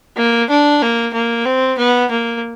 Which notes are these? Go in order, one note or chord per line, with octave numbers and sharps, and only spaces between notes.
A#3
D4
A#3
A#3
C4
B3
A#3